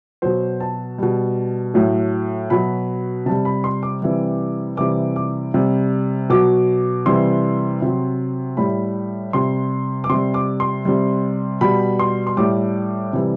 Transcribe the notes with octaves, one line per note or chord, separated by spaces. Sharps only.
B2 F#3 C5
A5
B2 G3
A2 F#3
B2 F#3 B5
C3 G3 A5
B5
C6
D6
C3 E3 G3
C3 E3 G3 D6
D6
C3 G3
B2 F#3 D6
C3 E3 G3 C6
C3 F#3
A2 G3 B5
C3 G3 C6
D6
C3 G3 C6
D6
C6
C3 G3
B2 G3 B5
C6
C6
A2 G3 D6
C3 E3 G3